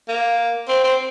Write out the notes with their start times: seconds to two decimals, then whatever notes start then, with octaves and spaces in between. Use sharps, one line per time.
0.08 A#3
0.69 C4
0.84 C4